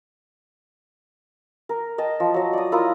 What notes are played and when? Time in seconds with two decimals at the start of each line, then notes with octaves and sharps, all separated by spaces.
1.69 A#4
1.98 D#5 G5 A5
2.20 F3
2.34 F#3 D#5
2.53 D5 D#6
2.72 E4 F4 A#4 D#6